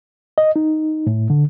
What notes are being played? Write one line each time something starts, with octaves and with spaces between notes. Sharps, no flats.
D#5
D#4
A2
D3